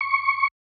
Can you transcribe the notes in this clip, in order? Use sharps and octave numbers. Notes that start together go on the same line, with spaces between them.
C#6